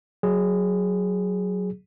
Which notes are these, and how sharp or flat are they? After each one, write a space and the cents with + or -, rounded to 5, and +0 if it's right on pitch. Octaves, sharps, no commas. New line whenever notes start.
F#3 +0 G#4 +0